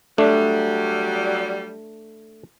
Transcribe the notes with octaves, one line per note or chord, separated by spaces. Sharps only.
F#3 G3 A3 D4